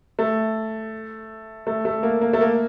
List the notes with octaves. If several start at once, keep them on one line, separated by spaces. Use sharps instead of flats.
A3
A3
A3
A#3
A#3
A3
A#3